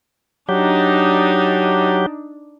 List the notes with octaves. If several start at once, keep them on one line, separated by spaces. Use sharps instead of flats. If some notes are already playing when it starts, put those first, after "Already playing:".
F#3 D4 D#4 G4